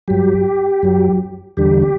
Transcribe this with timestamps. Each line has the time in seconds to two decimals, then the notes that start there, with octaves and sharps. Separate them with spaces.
0.08 G2 F#3 G4
0.83 F#2 F#3
1.57 E2 D3 G3 G4
1.82 G4